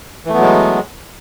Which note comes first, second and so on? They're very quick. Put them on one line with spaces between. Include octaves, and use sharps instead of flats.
E3 A3 B3 F#3 G#3